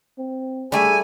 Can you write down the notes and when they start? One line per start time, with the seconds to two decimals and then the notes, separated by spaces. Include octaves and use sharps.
0.18 C4
0.72 G3 A3 G#4 E5 G#5